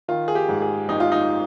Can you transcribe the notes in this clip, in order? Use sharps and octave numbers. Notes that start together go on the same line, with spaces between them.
D#3 F4
G#4
G4
G#2
G#4
G#1 D#4
F4
D#4